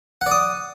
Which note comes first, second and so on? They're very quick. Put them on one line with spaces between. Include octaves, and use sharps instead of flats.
F#5 D5 D#6